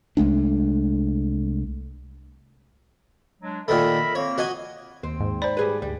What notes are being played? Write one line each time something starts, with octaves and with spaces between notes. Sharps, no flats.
C2 G#3 A3 D4
F#3 G#3 D4
A#2 D#3 A3 A#4 E5 B5
A#3 C4 C#5
F#4 D#5 G#5
D#2 C4
G#2
C5 D5 B5
G3 G#4 B4
D2 G3